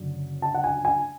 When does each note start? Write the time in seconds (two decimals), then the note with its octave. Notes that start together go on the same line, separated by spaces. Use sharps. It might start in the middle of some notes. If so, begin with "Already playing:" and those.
Already playing: F#1 F#2 D3
0.42 A5
0.55 F#5
0.64 G#5
0.85 G#5